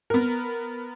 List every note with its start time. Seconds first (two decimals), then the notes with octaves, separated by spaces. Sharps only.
0.10 B3 A#4